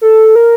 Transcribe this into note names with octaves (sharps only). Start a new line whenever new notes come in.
A4
A#4